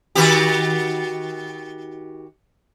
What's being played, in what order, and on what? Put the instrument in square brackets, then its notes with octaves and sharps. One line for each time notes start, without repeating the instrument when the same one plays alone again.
[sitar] D#3 F#4 G4